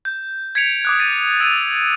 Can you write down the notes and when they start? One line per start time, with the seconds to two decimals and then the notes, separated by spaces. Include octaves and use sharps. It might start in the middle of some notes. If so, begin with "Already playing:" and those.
0.05 G6
0.55 G#6 B6 C#7 D7 F7
0.85 D6 D#6 F#6
1.00 A6 B6 D#7
1.40 E6 A6 D7 D#7 F7